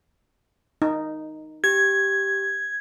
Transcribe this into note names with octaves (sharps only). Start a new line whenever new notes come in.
D#4
G4 G#6